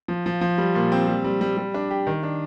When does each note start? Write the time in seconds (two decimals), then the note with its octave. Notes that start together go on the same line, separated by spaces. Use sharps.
0.08 F3
0.26 F3
0.41 F3
0.58 G3
0.75 A#2
0.92 C4
1.08 G3
1.24 G3
1.41 G3
1.57 G3
1.74 D4
1.91 G4
2.07 D#3
2.23 D4